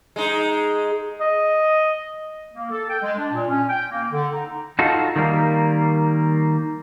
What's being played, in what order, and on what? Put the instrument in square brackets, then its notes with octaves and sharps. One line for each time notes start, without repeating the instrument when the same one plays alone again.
[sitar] G#3 D#4
[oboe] D#5
[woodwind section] A#3
A4
G5
G#3
D4
A#2
C#4
G5
A#3
D3
D#4
[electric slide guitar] D#4 F4 F#4 A4
D#3 G3 A#3